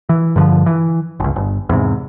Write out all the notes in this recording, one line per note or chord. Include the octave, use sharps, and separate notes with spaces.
E3
G2 D3 E3 F3
E3
G1 C#2
G1
E2 G#2 C3